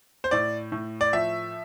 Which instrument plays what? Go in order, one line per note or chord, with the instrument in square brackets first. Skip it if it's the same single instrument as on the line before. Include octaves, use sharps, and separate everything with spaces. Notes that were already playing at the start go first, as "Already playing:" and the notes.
[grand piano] C5
A2 D5
A2
D5
F3 E5